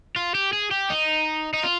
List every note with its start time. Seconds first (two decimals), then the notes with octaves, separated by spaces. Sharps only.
0.16 F4
0.35 G4
0.53 G#4
0.71 G4
0.90 D#4
1.54 D#4
1.64 F4